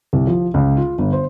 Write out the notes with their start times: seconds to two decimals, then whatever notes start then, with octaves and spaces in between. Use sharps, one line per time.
0.13 C2
0.27 F3
0.54 C#2
0.77 F4
0.99 G1
1.13 C5